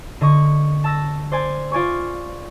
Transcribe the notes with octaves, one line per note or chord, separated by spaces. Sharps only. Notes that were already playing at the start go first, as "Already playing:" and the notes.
D3 D#5 C#6
A5 E6 A#6
C5 D5 G#5
F4 D5 G#5 C#6